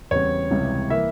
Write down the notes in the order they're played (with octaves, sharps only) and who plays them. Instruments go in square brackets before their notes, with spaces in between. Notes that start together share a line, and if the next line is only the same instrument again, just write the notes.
[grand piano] E2 C#3 G3 C4 C#5
C#2 C3 E3 G3
E3 A#3 E4 E5